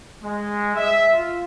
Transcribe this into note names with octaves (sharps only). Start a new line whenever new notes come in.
G#3
E5
F4